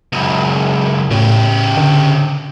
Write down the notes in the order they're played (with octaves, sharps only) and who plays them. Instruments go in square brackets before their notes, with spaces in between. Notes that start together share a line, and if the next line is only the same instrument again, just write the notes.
[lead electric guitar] C#2 F#2
[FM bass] A2 [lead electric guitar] C#3 G4
[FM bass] D3